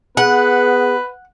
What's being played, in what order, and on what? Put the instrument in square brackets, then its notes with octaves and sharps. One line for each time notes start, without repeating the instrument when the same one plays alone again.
[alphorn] B3 [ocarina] G#4 [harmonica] B4 [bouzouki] F#5